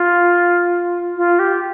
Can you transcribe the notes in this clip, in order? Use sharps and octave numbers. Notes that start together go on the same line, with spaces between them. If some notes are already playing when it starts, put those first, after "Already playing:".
Already playing: F4
F4
G4